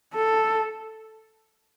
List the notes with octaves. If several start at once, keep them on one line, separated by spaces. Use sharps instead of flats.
A4